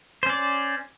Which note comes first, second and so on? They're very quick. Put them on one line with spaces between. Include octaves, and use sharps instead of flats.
C5 C#4 D5